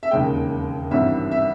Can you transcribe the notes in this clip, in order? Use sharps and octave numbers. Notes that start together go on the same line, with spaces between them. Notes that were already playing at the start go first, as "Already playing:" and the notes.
E5
E1 D#2 C#3 G#3 C#4 G5
G#1 G2 E3 G3 C#4 E5
E5